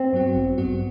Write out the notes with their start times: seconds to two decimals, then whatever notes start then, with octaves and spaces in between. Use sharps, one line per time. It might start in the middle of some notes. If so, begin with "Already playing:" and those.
Already playing: C4
0.13 G2 F#3 B3 F#4
0.34 A1
0.58 G2 F#3 B3 F#4